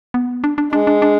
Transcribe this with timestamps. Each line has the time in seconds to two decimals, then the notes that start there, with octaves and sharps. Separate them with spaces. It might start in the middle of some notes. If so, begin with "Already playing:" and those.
0.14 B3
0.44 D4
0.58 D4
0.73 G#3 D4
0.87 D4
1.02 D4